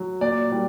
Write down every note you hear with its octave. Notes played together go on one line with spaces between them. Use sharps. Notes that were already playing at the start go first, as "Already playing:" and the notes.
Already playing: F#3
A#2 D5
G3